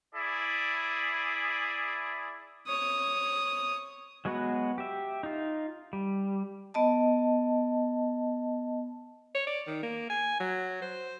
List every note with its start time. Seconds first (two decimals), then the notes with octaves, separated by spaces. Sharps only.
0.14 E4 G#4 D5
2.67 C#5 D#6
4.25 F#3 G#3 B3 F#4 B4
4.78 G4 E5
5.23 D#4 F4
5.93 G3
6.74 B3 D#5 A5
9.35 C#5
9.47 D5
9.67 D#3
9.83 A#3
10.10 G#5
10.40 F#3
10.82 C5